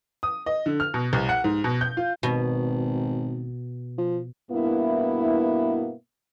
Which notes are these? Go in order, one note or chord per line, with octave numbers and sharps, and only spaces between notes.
D#6
D#5
D3
F6
B2
C2
F#5
G#2
B2
G6
F4
G#1 B2
F3
G2 B2 A#3 B3 E4